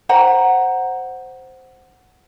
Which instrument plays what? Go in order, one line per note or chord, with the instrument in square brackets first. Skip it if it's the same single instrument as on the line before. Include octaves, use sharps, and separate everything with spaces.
[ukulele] C5 F#5 A#5